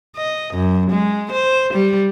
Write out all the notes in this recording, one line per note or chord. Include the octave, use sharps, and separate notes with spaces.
D#5
F#2
G#3
C5
G3